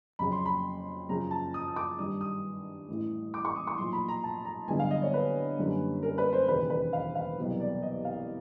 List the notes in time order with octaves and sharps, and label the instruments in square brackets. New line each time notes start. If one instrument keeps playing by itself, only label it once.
[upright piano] F2 C#3 F#3 B5
C6
B5
F#2 C#3 F3 A#5
A5
D#6
D#6
D6
G2 D#3 G3 D#6
D#6
A1 A2 E3
D6
C#6
D#6
C#6
B1 A#2 F3 C6
B5
A#5
A5
A#5
G1 G2 D3 F#3 B3 G#5
F5
D#5
C#5
B4
F#2 D3 G3 A#3 C#4
A#4
B4
C5
E1 D#2 C#3 B4
B4
F5
F5
C2 B2 F#3 B3
D5
D#5
F5